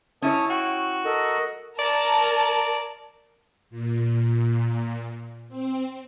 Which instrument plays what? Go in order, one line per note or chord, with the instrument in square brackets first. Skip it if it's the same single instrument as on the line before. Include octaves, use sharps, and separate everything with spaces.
[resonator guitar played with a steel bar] C#4 E4 C#5 [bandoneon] A5 D#6
[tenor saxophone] F#4 [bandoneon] G5
[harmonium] A4 A#4 [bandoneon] D#5
[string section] A#4 A5 A#5 [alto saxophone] D5
[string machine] A#2
C4